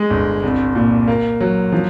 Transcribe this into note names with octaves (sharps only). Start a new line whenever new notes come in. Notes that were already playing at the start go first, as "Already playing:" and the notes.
Already playing: G#3
G1
C2
A#2
A#3
F#3
F3